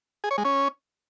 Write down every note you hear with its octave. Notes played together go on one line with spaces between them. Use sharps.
G#4
C#5
G#3
C#4